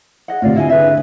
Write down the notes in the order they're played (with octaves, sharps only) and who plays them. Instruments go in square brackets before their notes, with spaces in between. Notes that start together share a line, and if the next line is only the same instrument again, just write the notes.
[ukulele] G#4 D#5 F#5
[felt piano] A2 C3 [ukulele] F4 D5 F5
[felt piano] D3 [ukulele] E4 D#5 G#5
[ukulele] G#4 B4 E5